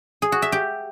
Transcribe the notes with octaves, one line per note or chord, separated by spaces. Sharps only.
G#4
F#4
E5
G4